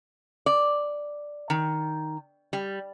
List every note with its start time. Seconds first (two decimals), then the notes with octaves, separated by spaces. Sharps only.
0.46 D5
1.50 D#3
2.53 G3